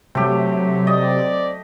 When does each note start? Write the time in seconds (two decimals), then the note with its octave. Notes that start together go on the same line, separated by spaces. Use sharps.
0.15 C3 F#3 A3 G4
0.87 C4 D5 D#5